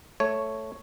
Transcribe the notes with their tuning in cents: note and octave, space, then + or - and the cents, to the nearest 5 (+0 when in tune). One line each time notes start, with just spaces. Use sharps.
A3 +0 C#5 +0